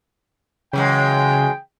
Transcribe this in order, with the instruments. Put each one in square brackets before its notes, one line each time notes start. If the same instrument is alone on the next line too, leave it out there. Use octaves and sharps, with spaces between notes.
[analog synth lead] C#3 [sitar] E3 F#3 G#3 [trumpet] G5